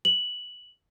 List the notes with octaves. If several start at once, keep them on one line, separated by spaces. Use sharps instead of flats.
F#7